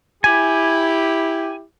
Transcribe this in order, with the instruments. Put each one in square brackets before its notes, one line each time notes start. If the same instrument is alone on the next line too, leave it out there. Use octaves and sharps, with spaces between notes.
[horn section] E4 G4 [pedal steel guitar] G#5